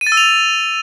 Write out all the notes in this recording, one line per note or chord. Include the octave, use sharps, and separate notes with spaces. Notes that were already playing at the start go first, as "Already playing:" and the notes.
D#7
A6
E6
F7